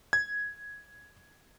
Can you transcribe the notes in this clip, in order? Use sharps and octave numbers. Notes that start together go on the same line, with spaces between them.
G#6